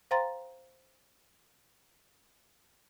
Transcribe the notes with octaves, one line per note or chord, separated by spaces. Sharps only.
C5 F5 G5 A#5 C6 A6